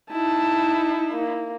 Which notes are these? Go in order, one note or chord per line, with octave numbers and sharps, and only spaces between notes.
D#4 E4 A5
A#3